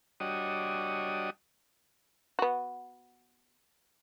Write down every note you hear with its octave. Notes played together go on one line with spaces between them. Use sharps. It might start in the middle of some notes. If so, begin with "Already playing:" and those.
G3 D4 F#4 C#5 D#5 D#6
B3 F#4